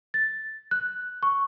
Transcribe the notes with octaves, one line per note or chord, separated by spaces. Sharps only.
A6
F#6
C#6